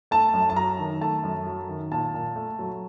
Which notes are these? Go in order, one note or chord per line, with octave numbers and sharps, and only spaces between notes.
A3 A5
F#2
A5
F#3 A#5
D#3
A3 A5
F#2
F#3
D#3
A#2 A5
A#2
A3
F#3